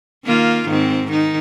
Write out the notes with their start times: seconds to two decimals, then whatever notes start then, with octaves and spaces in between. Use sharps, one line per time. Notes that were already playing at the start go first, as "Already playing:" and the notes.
0.25 D#3 A#3 F4
0.68 G#2 D#3 C4
1.08 D#3 D#4